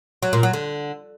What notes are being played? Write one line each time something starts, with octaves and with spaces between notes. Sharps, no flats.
F#3
A#2
F#3
D3